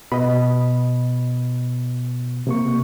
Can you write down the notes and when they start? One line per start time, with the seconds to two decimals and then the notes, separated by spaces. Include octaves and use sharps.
0.12 B2 D#5 B5
2.47 C3 A#3 C#6